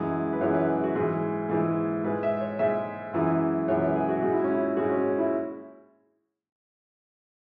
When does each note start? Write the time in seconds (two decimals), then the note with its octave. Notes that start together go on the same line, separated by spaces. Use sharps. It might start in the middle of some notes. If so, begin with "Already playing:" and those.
Already playing: F#2 E3 G#3
0.33 B4
0.41 F#2 E3 G#3 C#5
0.54 B4
0.68 G#4
0.83 F#4
0.95 G#2 E3 G#3 G#4
1.49 G#2 E3 G#3
2.04 G#2 G#3 B4
2.23 E5
2.41 C#5
2.59 G#2 G#3 E5
3.13 F#2 E3 G#3
3.68 F#2 E3 G#3 C#5
3.82 B4
3.95 G#4
4.09 F#4
4.22 G#2 G#3 F#4
4.33 E4
4.44 C#4
4.55 E4
4.77 G#2 G#3 F#4
4.91 C#4
5.18 E4